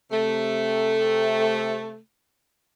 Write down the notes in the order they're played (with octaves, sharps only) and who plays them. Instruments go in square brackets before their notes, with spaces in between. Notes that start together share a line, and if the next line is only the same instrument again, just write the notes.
[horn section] C3 A3